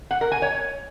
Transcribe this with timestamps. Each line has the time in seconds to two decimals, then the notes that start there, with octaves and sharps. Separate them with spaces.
0.11 F#5
0.21 A#4
0.32 G#5
0.42 C#5